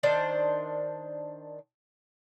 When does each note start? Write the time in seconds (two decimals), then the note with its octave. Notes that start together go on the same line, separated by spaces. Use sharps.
0.03 D#3 D4 C5